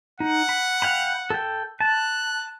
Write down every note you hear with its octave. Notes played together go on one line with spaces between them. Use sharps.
D#4 F#5
B5
F5 G5 B5
A4 G5
A5 F#6